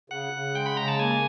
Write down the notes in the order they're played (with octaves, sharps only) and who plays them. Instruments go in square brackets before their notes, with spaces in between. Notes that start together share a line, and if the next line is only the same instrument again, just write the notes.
[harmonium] C#3 [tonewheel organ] F#5
[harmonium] C#3
[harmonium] G#3 [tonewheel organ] G5
[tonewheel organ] B5
[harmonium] C#3 [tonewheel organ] A#5
[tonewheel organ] A5
[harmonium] A#3 [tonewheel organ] G#5